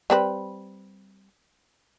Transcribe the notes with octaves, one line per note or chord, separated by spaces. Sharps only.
G3 C4 B4